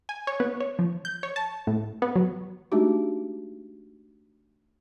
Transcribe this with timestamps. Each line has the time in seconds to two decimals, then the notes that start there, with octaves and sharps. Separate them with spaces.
0.09 G#5
0.27 C#5
0.40 B3
0.60 C#5
0.79 F3
1.05 G6
1.23 C#5
1.36 A5
1.67 A2
2.02 B3
2.16 F#3
2.72 G#3 A3 D4 D#4 F#4 G4